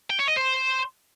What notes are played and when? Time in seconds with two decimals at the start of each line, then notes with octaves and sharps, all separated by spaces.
0.10 G5
0.19 C#5
0.28 D#5
0.37 C5